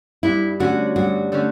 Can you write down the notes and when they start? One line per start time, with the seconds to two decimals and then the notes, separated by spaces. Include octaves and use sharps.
0.23 G2 E4
0.60 D3 A3 C#4 F#4
0.96 G2 F#4
1.32 D3 A3 C#4